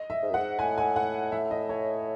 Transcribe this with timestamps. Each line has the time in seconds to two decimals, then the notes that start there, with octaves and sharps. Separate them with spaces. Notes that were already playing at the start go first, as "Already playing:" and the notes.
Already playing: D#5
0.10 E5
0.22 G#2
0.30 F#2
0.34 G#2 F#5
0.59 A2 G#5
0.78 G#5
0.96 F#5
1.32 E5
1.51 D#5
1.69 C#5